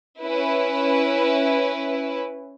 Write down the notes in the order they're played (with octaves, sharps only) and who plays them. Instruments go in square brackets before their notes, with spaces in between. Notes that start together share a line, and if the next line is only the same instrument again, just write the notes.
[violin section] C#4 E4 B4